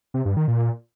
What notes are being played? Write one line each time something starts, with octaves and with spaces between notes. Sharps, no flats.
C3
G2
D#3
A#2